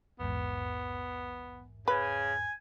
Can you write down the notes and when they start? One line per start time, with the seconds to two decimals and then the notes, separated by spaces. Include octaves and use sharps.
0.19 A#1 E2 G#2 B3
1.88 C#3 B4 G#5